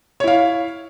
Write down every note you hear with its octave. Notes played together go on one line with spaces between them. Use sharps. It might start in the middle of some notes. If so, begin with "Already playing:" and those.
E4 C#5 F5